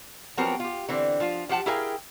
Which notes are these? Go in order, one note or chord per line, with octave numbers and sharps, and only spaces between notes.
F3 F#3 B3 C4 G4 A#4
F4 G4
D3 E3 C4
F3 F4
F3 G4 F#5 A5
E4 G4 G#4 A#4 F5 G5